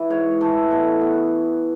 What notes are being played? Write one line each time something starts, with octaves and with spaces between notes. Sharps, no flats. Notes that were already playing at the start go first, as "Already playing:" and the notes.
Already playing: E3
G#2 C#5
E3 A3 A4
B2 A4
B3